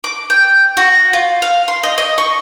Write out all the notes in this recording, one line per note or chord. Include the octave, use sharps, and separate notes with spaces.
D6
G5
F#4
F4
F5
C6
D#5
D#5
C#6